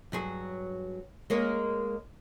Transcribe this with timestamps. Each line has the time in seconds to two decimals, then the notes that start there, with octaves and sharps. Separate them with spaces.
0.12 G2 F#3 G#4
1.30 G#3 A#3 C#4